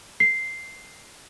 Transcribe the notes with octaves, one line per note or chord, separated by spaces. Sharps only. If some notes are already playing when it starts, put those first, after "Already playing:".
C7